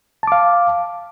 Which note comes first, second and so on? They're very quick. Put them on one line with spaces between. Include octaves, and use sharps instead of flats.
A5 D6 F5